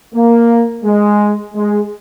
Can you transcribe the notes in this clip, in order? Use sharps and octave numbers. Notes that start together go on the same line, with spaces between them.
A#3
G#3
G#3